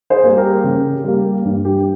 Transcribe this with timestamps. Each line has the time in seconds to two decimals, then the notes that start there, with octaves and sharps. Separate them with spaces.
0.10 G#4 C5
0.24 G3 A#3
0.37 G4 A#4
0.64 C#3
1.04 G3 A#3
1.45 G2
1.65 G4